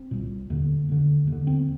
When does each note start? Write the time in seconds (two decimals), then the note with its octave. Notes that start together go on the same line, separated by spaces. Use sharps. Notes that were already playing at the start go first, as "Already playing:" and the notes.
Already playing: C4
0.11 C2 A#2
0.50 D#2 D3
0.89 D#2 D3
1.27 D#2
1.32 D3
1.47 C4